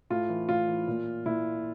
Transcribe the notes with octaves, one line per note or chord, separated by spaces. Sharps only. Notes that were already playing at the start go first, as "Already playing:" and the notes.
A2 F4
E3
A2 F4
E3
A#2
A#2 E4